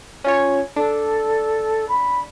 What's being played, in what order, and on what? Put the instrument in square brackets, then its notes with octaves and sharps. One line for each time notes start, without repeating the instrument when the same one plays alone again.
[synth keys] C#4 F4 C#5
[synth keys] D4 [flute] A4
[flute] B5